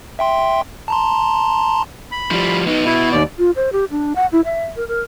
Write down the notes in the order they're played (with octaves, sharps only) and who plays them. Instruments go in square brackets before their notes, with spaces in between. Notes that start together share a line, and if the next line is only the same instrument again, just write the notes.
[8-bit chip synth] E5 G5 C6
A5 A#5 C6
[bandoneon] B5
[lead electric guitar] F3 G3
B3 D#4
[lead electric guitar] B2 [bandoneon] E4
[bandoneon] D#2 D5
[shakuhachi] F4
C5
G4
D4
F#5
E4
E5
A#4
A#4